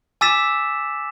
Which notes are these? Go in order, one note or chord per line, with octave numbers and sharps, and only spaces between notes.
G#5 D6 E6 A6 B6 E7